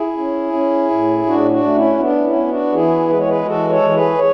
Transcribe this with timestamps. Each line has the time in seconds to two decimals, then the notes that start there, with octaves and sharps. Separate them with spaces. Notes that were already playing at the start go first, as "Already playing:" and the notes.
Already playing: E4 G#4
0.17 C#4
0.53 C#4
0.90 A2
1.26 A2 D4 F#4
1.51 D4 F#4
1.63 A3
1.75 C#4 E4
1.99 B3 D4
2.24 C#4 E4
2.36 B3
2.48 D4 F#4
2.72 E3 E4 G#4
3.09 G#3 B4
3.19 C#5
3.28 G#4 B4
3.45 E3 F#4 A4
3.70 A4 C#5
3.82 E3
3.90 A4
3.94 G#4 B4
4.18 C#5